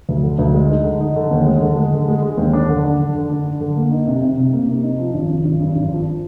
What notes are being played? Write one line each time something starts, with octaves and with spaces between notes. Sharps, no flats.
D2
D3
D2
G#3
D#4
D3
D#4
D3
D#2
G#3
D3
G#3
D3
G#3
G#3
D#2
D4
D3
D4
D3
D3
D4
D4
D3
A#3
D#4
C3
C3
C3
A#3
C3
D#4
F3
G#1
G#1
G#1
G2
G#1
F3